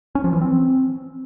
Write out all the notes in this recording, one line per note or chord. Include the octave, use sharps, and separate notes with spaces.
C#4
F3
E3
C4